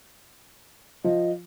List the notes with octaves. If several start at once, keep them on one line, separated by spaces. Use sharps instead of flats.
F3 D#5